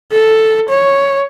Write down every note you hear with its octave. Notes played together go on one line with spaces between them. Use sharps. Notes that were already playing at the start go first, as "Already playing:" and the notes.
A4
C#5